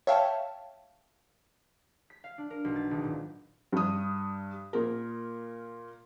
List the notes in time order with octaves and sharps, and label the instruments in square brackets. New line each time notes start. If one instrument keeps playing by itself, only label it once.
[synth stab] C#5 E5 F5 G5 A5
[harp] B6
F5
D4
A#4
B1
A6
G#1
A#2
[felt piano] G2 D#6
A#2 A#4